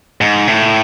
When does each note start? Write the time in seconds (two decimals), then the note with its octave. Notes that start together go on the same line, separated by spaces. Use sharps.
0.21 G#2
0.47 A2